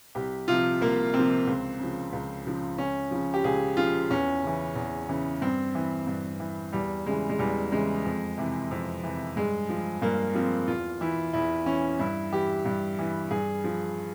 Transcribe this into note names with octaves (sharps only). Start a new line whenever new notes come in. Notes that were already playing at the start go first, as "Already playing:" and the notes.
C2 G4
C3 F3 F4
C2 A#3
C3 F3 C4
C#2
C#3 F3
C#2
C#3 F3
C#2 C#4
C#3 F3
G4
C#2 G#4
C#3 F3 F4
E2 C#4
C#3 E3
E2
C#3 E3
G2 C4
E3
G2
E3
E2 G3
C#3 E3 G#3
G#3
E2 G3
C#3 E3 G#3
F2
C3 E3
F2
C3 E3
G2 G#3
F3
G2 A#3
F3 C4
E2 F4
E3 E4
E2 E4
E3 C#4
G2 E4
E3 G4
G2
E3
G2 G#4
F3